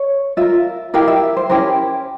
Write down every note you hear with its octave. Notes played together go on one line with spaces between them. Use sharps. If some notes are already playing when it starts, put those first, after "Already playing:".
Already playing: C#5
F4 A#4 E5
E4 G4 A#4 F5
E5
C5
C#4 E4 G4 A#4 C5